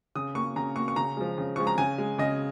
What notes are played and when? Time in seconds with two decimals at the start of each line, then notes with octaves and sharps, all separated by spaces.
0.15 C#3 D#6
0.35 A#3 C#6
0.56 C#3 A#5
0.76 A#3 C#6
0.88 C#6
0.96 C#3 A#5
1.17 F3 G#3
1.38 C#3
1.56 F3 G#3 C#6
1.67 A#5
1.78 C#3 G#5
1.98 G#3
2.18 C#3 D#5